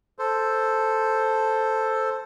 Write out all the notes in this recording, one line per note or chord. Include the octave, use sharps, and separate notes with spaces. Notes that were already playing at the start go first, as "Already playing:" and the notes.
A4 C5